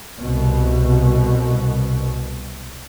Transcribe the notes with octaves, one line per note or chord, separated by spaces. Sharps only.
C2 B2